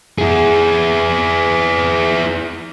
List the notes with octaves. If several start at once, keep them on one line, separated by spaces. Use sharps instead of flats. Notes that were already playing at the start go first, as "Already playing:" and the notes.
E4 G#4